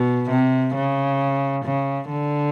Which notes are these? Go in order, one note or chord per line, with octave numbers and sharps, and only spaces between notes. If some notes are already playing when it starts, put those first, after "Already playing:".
Already playing: B2
C3
C#3
C#3
D3